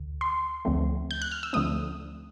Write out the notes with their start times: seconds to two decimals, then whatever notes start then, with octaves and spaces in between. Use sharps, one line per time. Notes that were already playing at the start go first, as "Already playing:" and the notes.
Already playing: D2 D3
0.21 C6
0.65 D2 D3 F3 A3 C4
1.11 G6
1.22 F#6
1.31 F6
1.43 E6
1.53 D2 D3 F3 A3 C4 D#6